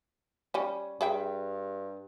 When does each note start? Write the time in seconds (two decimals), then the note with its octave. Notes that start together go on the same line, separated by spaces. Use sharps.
0.54 G3 C#4
1.01 G2 G#4 E5 G5